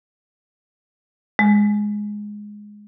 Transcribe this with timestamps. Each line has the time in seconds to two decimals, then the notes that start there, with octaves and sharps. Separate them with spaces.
1.39 G#3